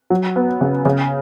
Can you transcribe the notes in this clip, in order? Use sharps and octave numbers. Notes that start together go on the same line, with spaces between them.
F#3
B3
C#3
C#3